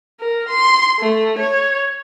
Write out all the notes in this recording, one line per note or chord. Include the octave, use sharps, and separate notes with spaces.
A#4
C6
A3
C#5